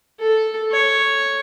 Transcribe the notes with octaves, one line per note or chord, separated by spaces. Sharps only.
A4
C#5